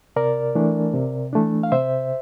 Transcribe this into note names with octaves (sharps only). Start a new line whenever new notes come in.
C3 A#4 D5
E3 A3 D4
C3
E3 A3 D4
F5
C3 C5 E5